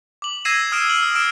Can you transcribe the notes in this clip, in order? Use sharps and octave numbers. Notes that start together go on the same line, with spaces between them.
D6 F#7
E6 G#6 A#6 C7 D#7 E7
D#6 F6 G#6 D7 E7
F6 F#7
E6
D#6 F6 D7 E7